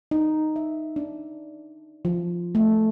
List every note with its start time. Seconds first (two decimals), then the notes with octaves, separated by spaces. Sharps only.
0.11 D#4
0.56 E5
0.96 D4
2.05 F3
2.55 A3